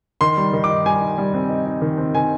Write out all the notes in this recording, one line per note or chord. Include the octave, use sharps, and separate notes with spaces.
D#3 C6
G3
D#3
D6
D#4
G3 G#5
D#4
G3
C4
D#4
D#4
D#3
C4
D#3 G#5